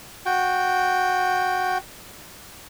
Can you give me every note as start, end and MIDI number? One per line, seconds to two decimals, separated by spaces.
0.26 1.78 66
0.26 1.78 79